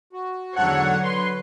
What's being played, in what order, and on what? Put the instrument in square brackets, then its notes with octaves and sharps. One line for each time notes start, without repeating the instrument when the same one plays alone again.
[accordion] F#4
[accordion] E2 G#2 A4 [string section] D3 F#3 C#5 [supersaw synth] F#5
[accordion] B4 [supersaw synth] C6